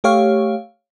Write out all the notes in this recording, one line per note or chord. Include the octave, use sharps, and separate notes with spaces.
A3 G4 C#5 F5